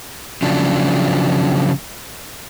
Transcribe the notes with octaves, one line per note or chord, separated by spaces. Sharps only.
C#3 F3 F#3 D4